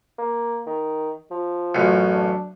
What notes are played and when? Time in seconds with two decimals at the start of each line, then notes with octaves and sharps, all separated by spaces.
0.18 A#3
0.66 D#3
1.31 F3
1.75 A1 F#2
2.14 D4